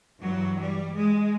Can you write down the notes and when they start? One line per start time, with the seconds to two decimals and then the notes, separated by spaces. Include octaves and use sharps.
0.21 G2 E3 F#3
0.57 G3
0.95 G#3